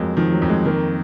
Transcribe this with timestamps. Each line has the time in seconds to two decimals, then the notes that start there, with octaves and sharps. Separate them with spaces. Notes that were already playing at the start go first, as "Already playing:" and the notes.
Already playing: F2 F#3 G#3 A#3
0.17 D#3 F3
0.32 F#3
0.42 F2
0.49 G#3
0.65 D#3 A#3